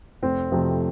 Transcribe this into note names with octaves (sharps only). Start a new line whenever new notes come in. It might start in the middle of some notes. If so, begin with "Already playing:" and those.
F1 C4
F2 C3 F3 A3